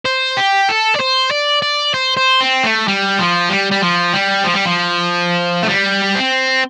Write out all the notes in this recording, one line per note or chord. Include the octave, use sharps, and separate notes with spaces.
C5
G4
A4
D5
C5
D5
D5
C5
C5
C4
A3
G3
F3
G3
G3
F3
G3
F3
G3
F3
A3
G3
C4